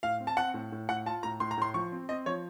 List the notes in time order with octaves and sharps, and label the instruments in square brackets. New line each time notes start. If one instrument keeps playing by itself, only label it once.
[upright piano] A2 [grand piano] F5
[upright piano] C4
[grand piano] A5
[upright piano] C4 [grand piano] F#5
[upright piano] A2
A2
[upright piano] A2 [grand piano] F#5
[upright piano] F4 [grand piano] A5
[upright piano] A2 [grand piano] A#5
[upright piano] A2 [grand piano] C6
[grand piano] A#5
[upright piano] A2 [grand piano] C6
[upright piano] F3 [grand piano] C#6
[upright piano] C4
[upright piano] C4 [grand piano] D#5
[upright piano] F3 [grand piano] C#5